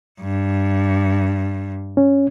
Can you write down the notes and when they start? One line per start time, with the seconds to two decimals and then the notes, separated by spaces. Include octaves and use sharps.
0.21 G2
1.97 C#4